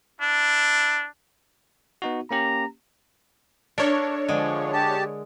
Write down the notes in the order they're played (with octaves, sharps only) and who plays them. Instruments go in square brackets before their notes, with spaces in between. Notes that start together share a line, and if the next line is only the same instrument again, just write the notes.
[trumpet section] D4 E4
[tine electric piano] B3 D#4 F#4
[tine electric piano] A#3 C#4 G4 [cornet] A#5
[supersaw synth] D4 C#5 [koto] A4 A#4 E5
[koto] D3 G#3 [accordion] F3
[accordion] G4 A5